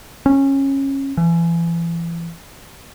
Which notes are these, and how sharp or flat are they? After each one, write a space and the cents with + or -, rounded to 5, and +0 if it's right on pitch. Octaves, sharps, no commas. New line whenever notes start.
C#4 -20
E3 +35